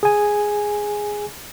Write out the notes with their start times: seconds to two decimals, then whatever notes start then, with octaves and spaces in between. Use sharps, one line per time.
0.03 G#4 G#5